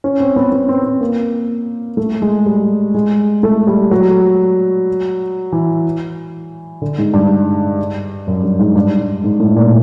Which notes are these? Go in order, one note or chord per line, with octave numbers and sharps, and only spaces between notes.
C#4
C4
B3
B3
C4
C4
A#3
A3
G#3
G3
G#3
A3
G3
F#3
E3
D3
G#2
G2
F#2
G2
G#2
G2
G2
G#2
A2
A#2